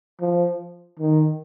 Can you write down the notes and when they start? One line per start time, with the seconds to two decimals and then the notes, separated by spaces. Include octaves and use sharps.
0.21 F3
0.99 D#3